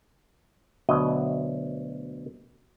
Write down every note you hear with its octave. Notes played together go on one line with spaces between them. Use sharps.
D2 B2 F#3 D#5